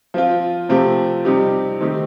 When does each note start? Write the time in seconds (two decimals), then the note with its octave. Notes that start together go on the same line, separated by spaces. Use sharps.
0.14 F3 C4 F4
0.69 C3 F3 A3 C4 G4
1.25 C3 G3 C4 D#4 G4
1.81 D#3 A3 C4 D#4 G4